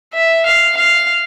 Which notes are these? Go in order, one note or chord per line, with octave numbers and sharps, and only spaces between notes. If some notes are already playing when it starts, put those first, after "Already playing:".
E5
F5
F5